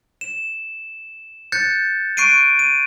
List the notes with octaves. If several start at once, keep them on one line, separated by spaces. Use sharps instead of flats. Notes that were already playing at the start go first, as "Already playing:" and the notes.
E7
F#6 G6 A6 C#7
C#6 F#6 C7 D7 D#7
D#7